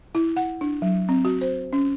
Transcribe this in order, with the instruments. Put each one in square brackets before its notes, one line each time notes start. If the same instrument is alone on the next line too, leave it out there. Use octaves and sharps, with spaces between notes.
[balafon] E4
F#5
D4
F#3
C4
F#4
C5
C#4